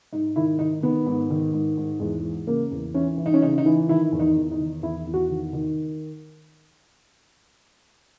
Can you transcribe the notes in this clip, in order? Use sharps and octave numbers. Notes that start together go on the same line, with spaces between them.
G#2 D#4
D#3 E4
D#3 D#4
D#3 B3
G#2
D#3
G#2
G#2
E2 G#3
E3
C#3 A#3
E2
E3 C#4
E3
D#4
C#4
C#3 D#4
D#4
E3
D#3 E4
E2
D#4
E2
D#4
D#3
E2 E4
E2
F#4
D#3
D#3